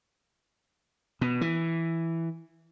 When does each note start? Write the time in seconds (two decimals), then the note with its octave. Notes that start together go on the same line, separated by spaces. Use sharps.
1.21 B2
1.41 E3